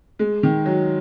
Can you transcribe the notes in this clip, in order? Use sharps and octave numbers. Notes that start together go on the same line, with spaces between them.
G#3
D#3
F#3